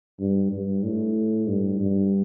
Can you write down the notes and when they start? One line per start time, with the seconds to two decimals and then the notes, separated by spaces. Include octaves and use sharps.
0.19 G2
0.52 G2
0.83 A2
1.48 G2
1.80 G2